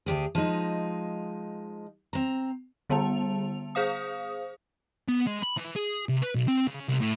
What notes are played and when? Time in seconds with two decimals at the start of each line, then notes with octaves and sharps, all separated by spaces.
0.06 D2 G4 G#4
0.35 F3 G#3 D#4
2.13 C4 A#5
2.90 D3 G3 B3 A5 F7
3.75 G#4 C5 F5 D#6
5.08 B3
5.27 G#3
5.42 B5
5.57 E3
5.75 G#4
6.09 C3
6.22 B4
6.35 B1
6.48 C4
6.67 C#3
6.88 C2
7.00 A2